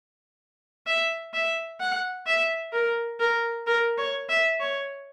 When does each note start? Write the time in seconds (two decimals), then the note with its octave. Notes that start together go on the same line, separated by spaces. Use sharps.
0.87 E5
1.34 E5
1.80 F#5
2.27 E5
2.73 A#4
3.20 A#4
3.67 A#4
3.97 C#5
4.29 E5
4.60 C#5